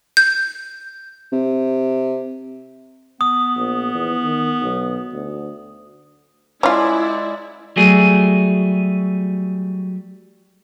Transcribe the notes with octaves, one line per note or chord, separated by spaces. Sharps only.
G6
C3
B3 D#6
A#1
E2
D#3
B1
D2
G#3 C#4 E4 F4 D5
F#3 G3 A3 G#4